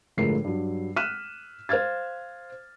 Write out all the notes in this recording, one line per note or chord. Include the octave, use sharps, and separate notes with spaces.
G1 A2 F3 G#3 A#4 C7
G2 F#3
F6 F#6 B6 D#7 E7
C5 F5 F6 G#6 A6